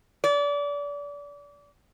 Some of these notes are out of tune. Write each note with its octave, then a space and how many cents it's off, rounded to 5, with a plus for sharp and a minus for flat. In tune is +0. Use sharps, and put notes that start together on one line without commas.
D5 -30